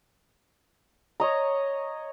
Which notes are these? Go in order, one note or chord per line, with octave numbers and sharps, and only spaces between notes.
C#5 D#5 A#5